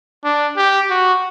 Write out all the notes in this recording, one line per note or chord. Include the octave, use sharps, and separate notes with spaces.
D4
G4
F#4